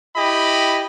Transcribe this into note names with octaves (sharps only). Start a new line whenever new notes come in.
E4 G4 D#5 B5